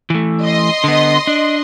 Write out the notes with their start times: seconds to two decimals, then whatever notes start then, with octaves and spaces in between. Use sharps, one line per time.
0.10 E3 A3
0.43 D#5 C6
0.84 D3 B3
1.27 D4